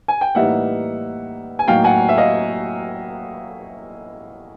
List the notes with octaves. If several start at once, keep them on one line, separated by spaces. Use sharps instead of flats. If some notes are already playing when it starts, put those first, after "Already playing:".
G#5
G5
A2 E3 G3 A#3 D#4 E5 F#5
G#5
A2 F#3 A#3 D#4 F5 G5
F#5 G#5
E5
D#5 F5